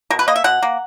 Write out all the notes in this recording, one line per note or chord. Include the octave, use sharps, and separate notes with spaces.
B2 A#4
B4
A#3 D#5
E5
B2 F#5
A#3